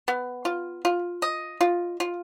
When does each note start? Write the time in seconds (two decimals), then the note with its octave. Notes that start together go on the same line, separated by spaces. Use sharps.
0.08 B3
0.45 F4
0.85 F4
1.22 D#5
1.61 F4
2.00 F4